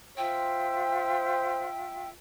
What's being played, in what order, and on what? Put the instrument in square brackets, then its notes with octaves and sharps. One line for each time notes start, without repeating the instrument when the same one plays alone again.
[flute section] F4 E5 E6 [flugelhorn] C5 [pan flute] G5